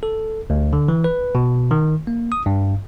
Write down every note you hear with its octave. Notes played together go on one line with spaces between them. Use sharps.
A4
D2
D3
E3
B4
B2
D#3
A#3
D#6
G2